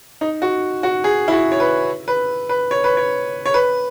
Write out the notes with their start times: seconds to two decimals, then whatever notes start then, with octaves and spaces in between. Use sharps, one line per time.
0.21 D#4
0.42 F#4
0.83 F#4
1.04 G#4
1.28 E4
1.32 F#4
1.52 C#5
1.60 B4
2.08 B4
2.49 B4
2.71 C#5
2.84 B4
2.97 C#5
3.46 C#5
3.54 B4